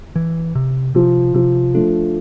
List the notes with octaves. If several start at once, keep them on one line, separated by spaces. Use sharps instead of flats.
E3
C3
C3 F3
C3 F3
F3 A3 D4